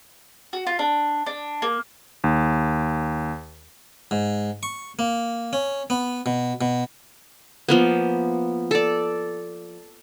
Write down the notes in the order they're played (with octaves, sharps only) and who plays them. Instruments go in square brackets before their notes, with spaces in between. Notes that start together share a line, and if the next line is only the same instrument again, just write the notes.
[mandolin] F#4
F4
D4
D4
A#3
[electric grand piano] D#2
[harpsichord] G#2
C#6
A#3
C#4
B3
B2
B2
[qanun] F3 A#3 B3
A4 D5